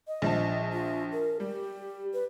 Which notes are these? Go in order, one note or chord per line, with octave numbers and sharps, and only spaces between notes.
D#5
A#1 F3 A5
F4
A#4
G3 G4
B4